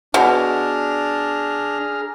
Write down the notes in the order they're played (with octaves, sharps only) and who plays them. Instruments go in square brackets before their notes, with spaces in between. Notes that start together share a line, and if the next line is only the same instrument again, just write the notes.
[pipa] B2 [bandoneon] D4 [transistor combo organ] G#4 A#5 F6